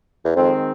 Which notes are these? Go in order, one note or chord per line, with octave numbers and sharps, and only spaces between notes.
E2
F2 D#3 G#3 C4